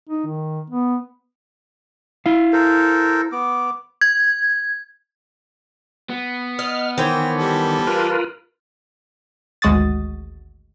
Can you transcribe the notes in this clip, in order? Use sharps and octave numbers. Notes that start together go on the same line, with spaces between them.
D#4
D#3
B3
E4 F5
A4 A#4 C5
B3 D6
G#6
B3
D#5 F6
D#3 E3 C5 C#5 G5
G3 A4
F4 A#4 B4
G#1 D2 G#3 F#4 D#6 A6